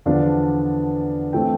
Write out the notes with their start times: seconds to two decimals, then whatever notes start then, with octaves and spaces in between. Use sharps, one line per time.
0.06 E2 D3 F3 B3 D4 D5 F5
1.33 E3 A3 C4 E5 G5